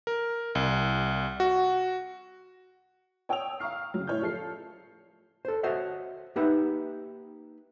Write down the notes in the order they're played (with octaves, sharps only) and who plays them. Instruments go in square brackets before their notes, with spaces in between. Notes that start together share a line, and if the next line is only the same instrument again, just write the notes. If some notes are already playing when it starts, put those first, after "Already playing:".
[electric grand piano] A#4
C2
F#4
[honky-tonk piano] C#5 G5 D#6 E6 F7
F5 A#5 C#6 F6 C7
C#3 F#3
A2 E4 C#5 F6 G6
F3 F4 A4 C7
[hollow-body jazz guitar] A4 C5
F#4 C5 C#5 D#5 E5 F#5
A#3 D#4 G4 B4 E5 F#5